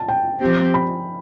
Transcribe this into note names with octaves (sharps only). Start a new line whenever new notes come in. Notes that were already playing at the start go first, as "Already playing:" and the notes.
Already playing: A5
G5
F3 C4 G4
B5